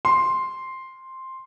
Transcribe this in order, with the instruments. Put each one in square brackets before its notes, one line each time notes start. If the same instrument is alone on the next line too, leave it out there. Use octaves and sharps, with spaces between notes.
[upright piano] C6